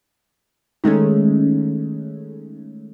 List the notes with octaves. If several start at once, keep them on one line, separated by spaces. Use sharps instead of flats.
D#3 G#3 A3 C#4